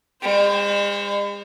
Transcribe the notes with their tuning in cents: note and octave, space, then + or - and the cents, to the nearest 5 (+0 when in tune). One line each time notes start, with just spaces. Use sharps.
G#3 -45 C5 +5